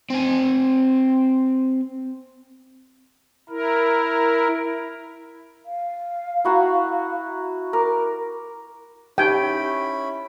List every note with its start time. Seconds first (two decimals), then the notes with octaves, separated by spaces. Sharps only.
0.10 C4 G#5
3.49 E4 A#4
5.65 F5
6.45 E4 F#4 A#5
7.73 A#4 D6
9.18 C#4 D#4 E4 G4 G5 G#5 B5